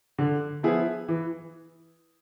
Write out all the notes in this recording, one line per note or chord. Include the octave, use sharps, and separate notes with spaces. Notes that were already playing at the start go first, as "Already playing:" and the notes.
D3
F3 B3 E4 G#4
E3